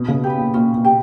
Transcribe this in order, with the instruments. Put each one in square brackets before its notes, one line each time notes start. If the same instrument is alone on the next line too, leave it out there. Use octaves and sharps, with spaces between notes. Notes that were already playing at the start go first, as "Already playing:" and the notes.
Already playing: [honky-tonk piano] B2
C#3
[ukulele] G4 B4
[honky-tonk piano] A#2
[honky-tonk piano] A#2 [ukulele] C#4
[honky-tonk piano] A#2
[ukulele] G4